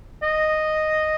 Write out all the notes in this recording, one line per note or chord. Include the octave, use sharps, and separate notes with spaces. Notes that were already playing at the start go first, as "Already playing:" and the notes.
D#5